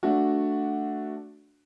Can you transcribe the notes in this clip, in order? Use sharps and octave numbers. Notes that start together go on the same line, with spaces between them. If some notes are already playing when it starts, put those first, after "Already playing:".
A3 D4 F#4